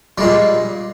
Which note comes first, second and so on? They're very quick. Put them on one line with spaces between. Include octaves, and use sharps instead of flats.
G3 G#3 A#2